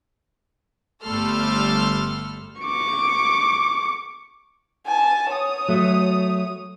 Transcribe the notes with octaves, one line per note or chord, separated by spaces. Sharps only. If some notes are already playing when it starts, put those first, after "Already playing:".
G1 G3 A3 A4 C6 F6
C#6 D6
G#5 A5
C#5 D#6
F#3 A3